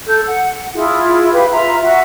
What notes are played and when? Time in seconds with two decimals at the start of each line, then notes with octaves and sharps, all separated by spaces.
0.07 A4 G6
0.28 F#5
0.75 E4 F4 G#4
1.32 G4 B4 F5
1.51 F4 E5 A#5
1.82 F#4 E5